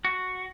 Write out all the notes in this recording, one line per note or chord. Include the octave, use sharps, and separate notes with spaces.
F#4